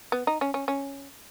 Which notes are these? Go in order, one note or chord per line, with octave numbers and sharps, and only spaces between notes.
B3
D#4
C#4
C#4
C#4